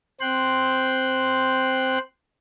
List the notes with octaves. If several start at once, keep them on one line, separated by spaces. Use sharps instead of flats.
C4 C5 G5 C6 F#6